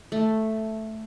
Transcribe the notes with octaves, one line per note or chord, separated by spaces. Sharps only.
A3